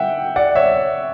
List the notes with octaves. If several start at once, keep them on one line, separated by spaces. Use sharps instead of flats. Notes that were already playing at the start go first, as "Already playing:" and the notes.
Already playing: E5 F#5 G5
D5 F#5
C#5 E5